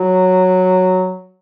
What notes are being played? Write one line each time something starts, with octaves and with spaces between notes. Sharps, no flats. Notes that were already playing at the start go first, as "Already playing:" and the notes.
Already playing: F#3